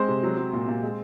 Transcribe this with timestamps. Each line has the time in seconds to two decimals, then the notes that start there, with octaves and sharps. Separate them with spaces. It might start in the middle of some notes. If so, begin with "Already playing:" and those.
Already playing: G#3 C4 C5
0.08 C3
0.23 F#3
0.37 F#3
0.53 A#2
0.68 A#2
0.83 G#3